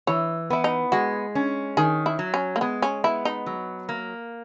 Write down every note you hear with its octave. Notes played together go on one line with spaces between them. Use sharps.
E3 C#5
B3 E4
D#4
G#3 F#4
C#4
D#3 G#4
E4
F#3
C#4
A#3
G#3 B3
C#4
B3 E4
D#4
F#3
A#3